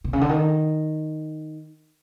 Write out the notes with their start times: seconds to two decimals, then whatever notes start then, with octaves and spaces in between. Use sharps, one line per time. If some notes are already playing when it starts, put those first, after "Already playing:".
0.04 C3
0.13 C#3
0.21 D3
0.29 D#3